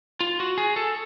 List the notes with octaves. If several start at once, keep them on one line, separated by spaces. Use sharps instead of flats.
F4
F#4
G#4
A4